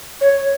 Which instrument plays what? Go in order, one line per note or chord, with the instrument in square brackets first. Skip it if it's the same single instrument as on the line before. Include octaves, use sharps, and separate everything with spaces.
[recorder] C#5